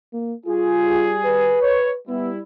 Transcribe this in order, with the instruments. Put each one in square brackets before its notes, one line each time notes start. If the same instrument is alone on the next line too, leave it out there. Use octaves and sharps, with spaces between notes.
[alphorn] A#3
[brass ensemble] G3 G#4 [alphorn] F4
[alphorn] B4
[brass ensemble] C#5
[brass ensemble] G3 E4 [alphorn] B3